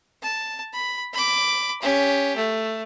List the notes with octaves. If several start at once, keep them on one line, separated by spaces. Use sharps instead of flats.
A5
B5
B5 D6
C#4 G4
A3